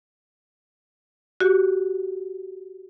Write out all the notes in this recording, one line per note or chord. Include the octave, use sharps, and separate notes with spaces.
F#4 G4